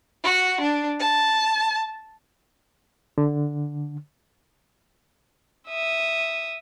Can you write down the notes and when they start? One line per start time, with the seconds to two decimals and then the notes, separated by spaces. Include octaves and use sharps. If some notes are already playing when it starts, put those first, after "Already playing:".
0.23 F#4
0.61 D4
1.00 A5
3.18 D3
5.68 E5 D#6